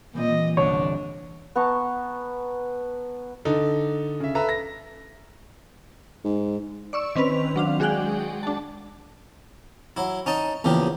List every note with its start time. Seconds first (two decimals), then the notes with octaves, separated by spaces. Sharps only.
0.14 A#2 E3 G3 C4 D#5
0.57 G1 C2 D4 C#5
1.56 B3 A5 A#5 C#6
3.45 D3 D#4 A4
4.20 C#3 E5
4.35 A4 B4 E5 A#5
4.49 A#6
6.24 G#2
6.93 D5 C#6 E6
7.15 D#3 C4 C#4 B4 F7
7.56 F#3 D4 F5
7.80 G#3 F#4 G#4 D5 F#5 G5
8.43 D4 A5
9.97 F#3 E4
10.26 C#4 D#4 A5
10.64 A#1 E2 C#3 G4